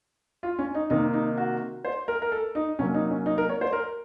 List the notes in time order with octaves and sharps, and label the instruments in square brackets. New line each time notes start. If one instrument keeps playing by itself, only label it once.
[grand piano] F4
C#4
D#4
C3 D#3 A#3 D#4
D#4
F#4
C5
A#4
A#4
A4
D#4
C3 F#3 A#3 C#4
D#4
C#4
D#4
A#4
C#5
C5
A#4